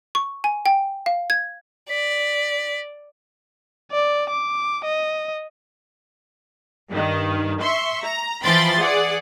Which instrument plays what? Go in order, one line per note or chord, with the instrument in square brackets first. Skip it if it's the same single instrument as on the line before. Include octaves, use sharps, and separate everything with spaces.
[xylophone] C#6
G#5
G5
F5
G#6
[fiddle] D5 [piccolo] B6
[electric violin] D5
D6
D#5
[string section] G2 D#3
E5 C6 C#6
A#5
E3 F3 G5 B5 C6 A6
G#4 D5 F#5